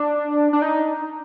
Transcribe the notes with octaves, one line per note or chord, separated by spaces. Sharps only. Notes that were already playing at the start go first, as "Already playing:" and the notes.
Already playing: D4
D4
D#4